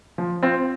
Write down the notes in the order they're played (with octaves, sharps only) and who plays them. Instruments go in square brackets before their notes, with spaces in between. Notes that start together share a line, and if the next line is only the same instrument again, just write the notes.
[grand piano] F3
C4 F4